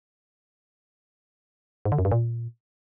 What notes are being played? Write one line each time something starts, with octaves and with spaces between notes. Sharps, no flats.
G#2
D3
F#2
G2
A#2